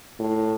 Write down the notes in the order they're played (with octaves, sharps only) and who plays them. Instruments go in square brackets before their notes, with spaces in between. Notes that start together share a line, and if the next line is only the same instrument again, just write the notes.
[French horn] A2